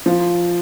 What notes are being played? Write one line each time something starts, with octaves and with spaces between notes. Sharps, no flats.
F3